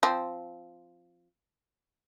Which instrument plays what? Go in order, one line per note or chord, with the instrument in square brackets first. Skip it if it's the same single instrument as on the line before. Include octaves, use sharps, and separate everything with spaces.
[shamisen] F3 C4